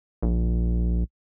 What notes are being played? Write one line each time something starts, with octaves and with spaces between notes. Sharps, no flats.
A#1